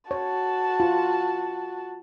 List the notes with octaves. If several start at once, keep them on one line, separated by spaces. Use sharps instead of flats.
F#4 C#5 A5
F4